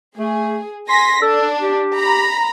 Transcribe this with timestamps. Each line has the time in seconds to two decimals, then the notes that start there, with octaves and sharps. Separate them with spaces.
0.17 A3 G#4
0.89 G#5 C6 A#6 B6
1.22 D4 A4
1.61 G4
1.95 A#5 B5